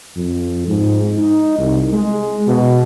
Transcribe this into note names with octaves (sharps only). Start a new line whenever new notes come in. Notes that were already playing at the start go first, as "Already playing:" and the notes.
F2
G#2
D#4
C2
G#3
B2